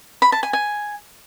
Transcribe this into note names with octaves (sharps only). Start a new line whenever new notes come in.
B5
A5
G#5
G#5